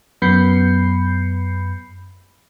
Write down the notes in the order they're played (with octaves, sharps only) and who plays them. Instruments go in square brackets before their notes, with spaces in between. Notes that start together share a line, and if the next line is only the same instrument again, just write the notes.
[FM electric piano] F#2 B3 B5 G6 C7 C#7